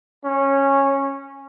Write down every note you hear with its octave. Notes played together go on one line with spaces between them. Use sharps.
C#4